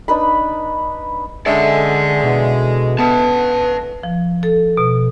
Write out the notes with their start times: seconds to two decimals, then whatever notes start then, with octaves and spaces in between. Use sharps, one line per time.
0.08 D4 D#4 B4 B5
1.46 D3 G#3 C#4 A4 D5 E5 F#5
2.23 B2 D3 E3
2.99 B3 B4 A5
4.03 F3
4.43 A4
4.77 B2